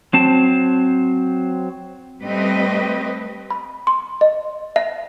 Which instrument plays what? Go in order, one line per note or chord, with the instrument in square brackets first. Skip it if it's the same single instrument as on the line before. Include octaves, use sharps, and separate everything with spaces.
[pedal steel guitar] F#3 C4 A5
[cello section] G3 A3 C4 B4 D#5
[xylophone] B5
C6
D#5
E5